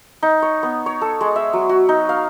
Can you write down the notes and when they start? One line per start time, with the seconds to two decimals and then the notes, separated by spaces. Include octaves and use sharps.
0.23 D#4
0.42 C#5
0.63 B3
0.86 C#5
1.01 A4
1.21 G#3
1.36 E5
1.53 F#3
1.69 F#4
1.89 D#4
2.09 F5